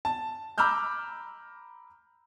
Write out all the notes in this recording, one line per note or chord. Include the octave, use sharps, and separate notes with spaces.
A5
A#5 B5 D6 E6 F6 G6